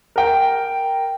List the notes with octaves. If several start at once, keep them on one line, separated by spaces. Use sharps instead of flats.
A#4 G5